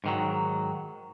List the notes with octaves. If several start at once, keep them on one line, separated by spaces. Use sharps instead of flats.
G#2 D#3 F#3